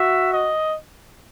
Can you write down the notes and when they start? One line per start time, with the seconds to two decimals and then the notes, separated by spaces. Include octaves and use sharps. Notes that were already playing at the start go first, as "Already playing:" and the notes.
Already playing: F#4 E5
0.33 D#5